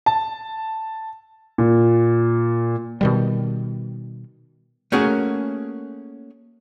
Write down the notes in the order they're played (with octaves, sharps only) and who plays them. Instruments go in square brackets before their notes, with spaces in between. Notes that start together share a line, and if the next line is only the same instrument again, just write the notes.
[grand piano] A5
A#2
[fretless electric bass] B2 D#3 G3
[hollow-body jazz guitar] A3 A#3 C#4 F#4 G#4 A#4